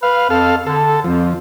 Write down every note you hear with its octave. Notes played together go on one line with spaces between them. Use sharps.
B4 F5
F2 A4 F5
D3 A4
F2 F3